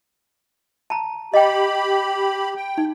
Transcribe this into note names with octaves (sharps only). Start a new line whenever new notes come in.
A5 A#5
G4 D#5 G5 B5
G5
D#4